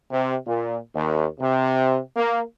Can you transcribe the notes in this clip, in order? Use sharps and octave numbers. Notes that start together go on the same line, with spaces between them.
C3
A#2
D#2
C3
A#3